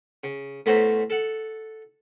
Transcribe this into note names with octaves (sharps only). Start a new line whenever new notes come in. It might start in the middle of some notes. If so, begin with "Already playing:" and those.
C#3
A2 A3 B3 C#4 C5 A#5
A4 F#5